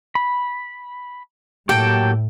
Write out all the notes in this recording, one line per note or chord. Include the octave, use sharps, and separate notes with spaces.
B5
A2 F#3 A#3 G4 A4 G5